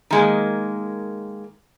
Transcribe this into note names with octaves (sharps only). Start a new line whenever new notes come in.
D#3 G#3 A#3